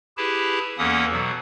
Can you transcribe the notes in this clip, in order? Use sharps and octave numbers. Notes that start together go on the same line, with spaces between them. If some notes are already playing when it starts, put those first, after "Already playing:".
E4 G4 G#4 B4 A5
E2 E3 A#3 C#4 A4 D#6
B2 F#3